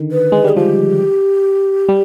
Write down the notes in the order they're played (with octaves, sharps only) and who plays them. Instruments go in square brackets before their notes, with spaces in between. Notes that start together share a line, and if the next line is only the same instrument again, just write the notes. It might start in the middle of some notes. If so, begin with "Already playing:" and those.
Already playing: [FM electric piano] D3 D#3
[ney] B4
[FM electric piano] G#3
[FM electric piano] G3 [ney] G#4
[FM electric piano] F3 [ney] G4
[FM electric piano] G3